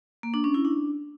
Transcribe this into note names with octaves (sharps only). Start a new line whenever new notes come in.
A#3
D4
C#4
E4
D4